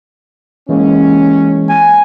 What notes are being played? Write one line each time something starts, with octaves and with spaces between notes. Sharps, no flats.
E3 G#3 A#3 C#4
G#5